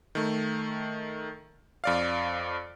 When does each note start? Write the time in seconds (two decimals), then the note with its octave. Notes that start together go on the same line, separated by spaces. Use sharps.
0.15 D#3 A3
1.84 F2 D5 F5